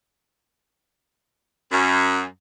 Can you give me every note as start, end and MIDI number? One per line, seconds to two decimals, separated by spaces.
1.71 2.23 42